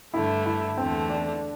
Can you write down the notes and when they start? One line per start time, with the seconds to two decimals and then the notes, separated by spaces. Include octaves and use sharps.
0.13 G2 D3 A3 E4
0.46 E4
0.77 E2 D3 A3 C4
1.10 D4